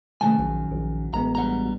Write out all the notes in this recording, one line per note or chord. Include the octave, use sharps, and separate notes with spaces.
F#2 C3 D#3 G#3 A3 B4 G#5 A5
A#1 F#3
A#1
A1 G#3 B3 A#5
G2 G3 F#4 F#5 A#5